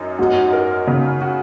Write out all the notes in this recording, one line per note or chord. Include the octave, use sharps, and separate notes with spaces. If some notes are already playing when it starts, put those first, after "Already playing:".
Already playing: F#2 D#4
G#2 F#4
A#4
C#3
F#4